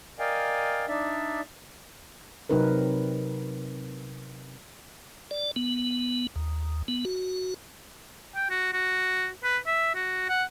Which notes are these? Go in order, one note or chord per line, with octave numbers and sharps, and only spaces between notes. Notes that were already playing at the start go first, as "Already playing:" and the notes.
A#4 D5 D#5 F5 G5 G#5
D4 D#4 D5 E5
C3 F#3 C4 D#4 A#4 B4
D5
B3
D#2
B3
F#4
G5
F#4
F#4
B4
E5
F#4
F#5